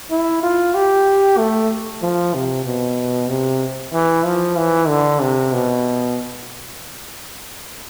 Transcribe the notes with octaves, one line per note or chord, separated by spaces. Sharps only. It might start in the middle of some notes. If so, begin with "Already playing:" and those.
E4
F4
G4
A3
F3
C3
B2
C3
E3
F3
E3
D3
C3
B2